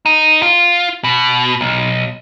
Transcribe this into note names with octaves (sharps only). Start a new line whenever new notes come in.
D#4
F4
B2
B1